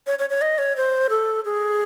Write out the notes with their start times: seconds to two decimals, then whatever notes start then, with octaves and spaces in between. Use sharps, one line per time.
0.07 C#5
0.19 C#5
0.30 C#5
0.42 D#5
0.58 C#5
0.76 C5
1.10 A4
1.45 G#4